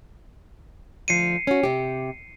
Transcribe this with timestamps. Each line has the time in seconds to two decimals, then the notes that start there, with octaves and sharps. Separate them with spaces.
1.08 D2 F3 C7 C#7 D#7
1.47 C#4 F#4
1.63 C3 G4